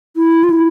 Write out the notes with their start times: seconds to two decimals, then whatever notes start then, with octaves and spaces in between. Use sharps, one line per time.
0.17 E4
0.44 F4
0.50 E4